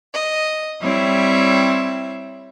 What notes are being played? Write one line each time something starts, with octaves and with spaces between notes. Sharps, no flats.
D#5
G3 C4 E4 C#5 E5